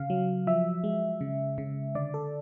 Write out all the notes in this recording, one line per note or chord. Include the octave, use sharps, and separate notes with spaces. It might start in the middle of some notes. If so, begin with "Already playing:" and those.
Already playing: C#3 F5
F#3
F3 E5
G#3
C#3
C#3
D3 D5
A4